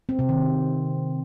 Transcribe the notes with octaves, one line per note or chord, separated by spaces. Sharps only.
C4
C3
D#3